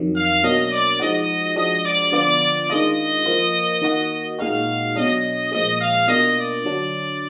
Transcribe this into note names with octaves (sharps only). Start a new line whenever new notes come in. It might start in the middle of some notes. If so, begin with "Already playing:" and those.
Already playing: F2 D#3 F#3
F5
B2 F#3 A#3 D4 D#5
D5
F3 G#3 D#4 F#4 D#5
F3 G#3 D4 F#4 D#5
D5
D3 F3 B3 F4 D5
D#3 G#3 D4 F4 D#5
F3 A#3 F4
D#3 A#3 D#4 F#4
A#2 G#3 D#4 F#4 F5
B2 F#3 D4 D#5
A#2 F3 G#3 D#5
F5
B2 A#3 D4 F4 D#5
D5
D3 F#3 D4